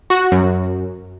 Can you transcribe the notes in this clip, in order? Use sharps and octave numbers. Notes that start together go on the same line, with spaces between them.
F#4
F#2